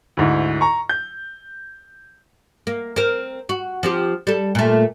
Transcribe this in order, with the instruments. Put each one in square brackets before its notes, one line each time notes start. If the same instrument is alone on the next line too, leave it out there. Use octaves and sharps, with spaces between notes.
[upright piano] D2 G#2 E4
A#5 C#6
G6
[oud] A#3
C4 A#4
F#4
F3 C4 G4
G3 A4
A#2 A3